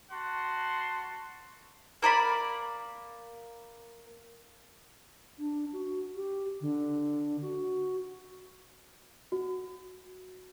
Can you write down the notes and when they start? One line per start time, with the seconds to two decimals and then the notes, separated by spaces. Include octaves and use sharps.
0.11 F#4 F#5 A5 C6
2.02 A#3 A#4 D5 B5
5.39 D4
5.73 F#4
6.16 G4
6.61 D3
7.42 F#4
9.32 F#4